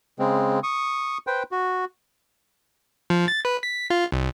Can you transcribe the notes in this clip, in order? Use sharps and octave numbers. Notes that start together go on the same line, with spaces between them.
C#3 G#3 C4
C#6 D#6
B4 C5 G5
F#4
F3
A6
B4
B6
F4
C2